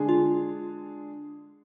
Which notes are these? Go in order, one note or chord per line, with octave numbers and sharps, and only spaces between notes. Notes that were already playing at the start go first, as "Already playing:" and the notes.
Already playing: D3 G#3 D4 G#4
F4